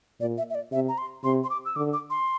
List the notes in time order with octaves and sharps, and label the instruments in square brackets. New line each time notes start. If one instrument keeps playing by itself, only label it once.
[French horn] A#2 [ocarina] D5
[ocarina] E5
E5
D5
[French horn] C3 [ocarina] E5
[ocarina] A#5
C6
[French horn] C3 [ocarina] C6
[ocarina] C6
D6
E6
[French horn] D3 [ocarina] D6
[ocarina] D6
C6